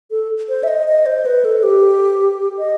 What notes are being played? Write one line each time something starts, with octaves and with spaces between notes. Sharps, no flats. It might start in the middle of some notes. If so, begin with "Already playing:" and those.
A4
C5
E5
D#5
D#5
C5
B4
A4
G4
D#5